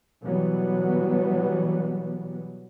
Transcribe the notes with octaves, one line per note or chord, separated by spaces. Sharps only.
B2 E3 F#3 G3 B3